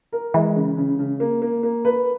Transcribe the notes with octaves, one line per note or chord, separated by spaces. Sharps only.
A#4
E3 G#3
C#3
C#3
C#3
A#3
A#3
A#3
B4